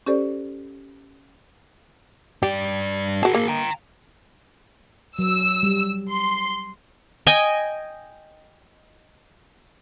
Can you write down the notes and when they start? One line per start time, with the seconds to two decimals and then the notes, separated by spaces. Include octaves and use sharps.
0.06 C#4 G4 A4 C5 D5
2.43 G2 G4 D5
3.23 F#4 G#4 A#4 A5
3.35 A#3
3.48 G5 A#5
5.19 F#3 E6
5.63 G3
6.14 C6
7.27 D#5 G5 G#5